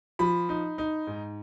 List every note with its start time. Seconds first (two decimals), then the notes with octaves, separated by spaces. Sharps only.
0.19 F3 B5
0.49 D#4
0.78 D#4
1.07 G#2